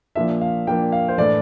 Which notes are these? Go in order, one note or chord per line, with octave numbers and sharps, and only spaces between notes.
A#2 F3 A#3 D4 E5
F5
A#2 F3 A#3 D4 G5
F5
C5
A2 E3 A3 D4 D5